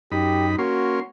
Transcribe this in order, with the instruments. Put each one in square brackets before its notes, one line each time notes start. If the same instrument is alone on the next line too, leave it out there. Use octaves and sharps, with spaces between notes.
[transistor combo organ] F#2 D#4 B5 [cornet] G4
[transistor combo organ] A#3 C#4 C6 [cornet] F#4